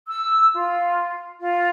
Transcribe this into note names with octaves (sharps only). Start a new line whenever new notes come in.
E6
F4
F4